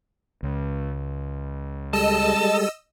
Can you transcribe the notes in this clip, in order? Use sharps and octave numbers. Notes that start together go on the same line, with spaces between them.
C#2
G3 G#3 A4 D#5 A5 E6